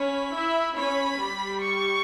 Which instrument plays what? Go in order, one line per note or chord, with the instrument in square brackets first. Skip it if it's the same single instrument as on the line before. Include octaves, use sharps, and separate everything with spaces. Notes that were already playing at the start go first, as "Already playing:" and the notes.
Already playing: [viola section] C#4 C#5 [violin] B5
[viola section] E4 E5
[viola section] C#4 C#5 [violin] B5
[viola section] G3 G4
[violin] C#6